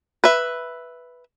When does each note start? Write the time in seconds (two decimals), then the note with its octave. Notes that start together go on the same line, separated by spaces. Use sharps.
0.24 B4 E5